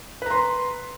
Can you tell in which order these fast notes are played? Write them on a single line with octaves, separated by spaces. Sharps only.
B4 A#5 C6